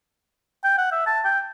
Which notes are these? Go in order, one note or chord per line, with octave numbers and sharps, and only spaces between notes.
G5
F#5
E5
A5
G5